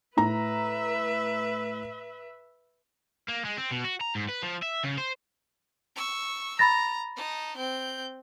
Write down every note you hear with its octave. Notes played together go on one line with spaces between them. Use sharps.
A2 E4 B4 E5 A#5
A#3
G#3
C4
B2
F#4
A#5
G#2
B4
F3
E5
C#3
C5
C#6 E6
A#5 B5 A6 A#6
D#4 A5
C4 G6